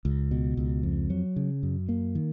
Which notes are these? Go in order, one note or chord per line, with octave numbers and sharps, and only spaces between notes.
C#2
B2
C#2
F2
F#3
C#3
F#2
A#3
D#3